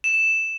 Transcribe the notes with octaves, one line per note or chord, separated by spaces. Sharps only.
E7